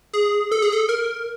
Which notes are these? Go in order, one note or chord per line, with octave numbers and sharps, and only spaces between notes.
G#4
A4
G#4
A4
A#4